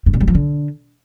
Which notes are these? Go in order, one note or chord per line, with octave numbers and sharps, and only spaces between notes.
G2
A#2
G3
F3
D3